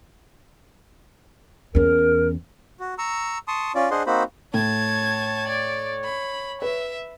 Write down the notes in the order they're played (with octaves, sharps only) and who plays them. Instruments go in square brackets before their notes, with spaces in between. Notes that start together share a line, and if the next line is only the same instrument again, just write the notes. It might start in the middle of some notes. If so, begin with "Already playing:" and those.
[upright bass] E2 C#4 [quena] A#4
[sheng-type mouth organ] F#4
A#5 C#6 E6
A5 C6 C#6 D#6
C#4 F4 D5
D4 G#4 C5 D#5 F#5 C6
A#3 C4 D#4 F#4 C5 B5
[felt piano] A2 [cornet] C#5 [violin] A5 G#6
[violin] D5
B5
[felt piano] B4 [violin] E5